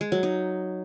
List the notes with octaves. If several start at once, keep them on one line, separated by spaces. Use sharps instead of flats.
G#3
F#3
D#4